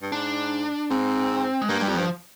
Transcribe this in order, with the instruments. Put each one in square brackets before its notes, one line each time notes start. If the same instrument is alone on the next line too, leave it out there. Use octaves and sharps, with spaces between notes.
[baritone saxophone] G2
[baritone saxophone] G#2 [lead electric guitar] D4
[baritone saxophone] G#2 [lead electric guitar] C4
[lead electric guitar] G#3
[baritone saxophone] G2 [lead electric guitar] A#3
[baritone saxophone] G2
[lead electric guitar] G3
[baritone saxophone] F2
[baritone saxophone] G2 [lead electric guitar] F3